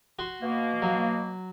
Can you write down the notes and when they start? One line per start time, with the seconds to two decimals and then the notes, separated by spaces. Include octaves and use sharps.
0.19 F#4 C6
0.42 B2 A#3
0.82 F#3